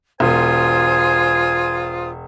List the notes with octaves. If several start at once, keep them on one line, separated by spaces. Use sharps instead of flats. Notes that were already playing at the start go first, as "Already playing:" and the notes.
E1 F4 C5 G#5 D#6